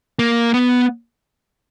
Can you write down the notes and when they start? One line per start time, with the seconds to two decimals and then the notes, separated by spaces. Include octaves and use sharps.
0.19 A#3
0.54 B3